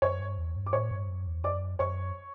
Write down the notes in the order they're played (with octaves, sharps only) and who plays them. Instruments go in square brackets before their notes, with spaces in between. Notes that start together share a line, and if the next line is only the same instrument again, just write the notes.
[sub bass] F#2 [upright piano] C#5 C#6
[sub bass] G2
E2
G2
[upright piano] D6
[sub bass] A2 [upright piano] C#5 C#6
[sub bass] G2
F#2
E2
[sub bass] F#2 [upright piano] D5 D6
[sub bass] F#2 [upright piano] C#5 C#6